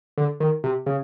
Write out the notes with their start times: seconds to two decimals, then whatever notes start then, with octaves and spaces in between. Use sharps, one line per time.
0.18 D3
0.40 D#3
0.64 C3
0.86 C#3